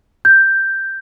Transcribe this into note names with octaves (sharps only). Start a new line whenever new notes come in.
G6